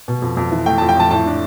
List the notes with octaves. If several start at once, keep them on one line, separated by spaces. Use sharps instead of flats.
B2
F2
F2
E3
A3 G5
F2 A5
G5
F2 A5
A2 A5
D4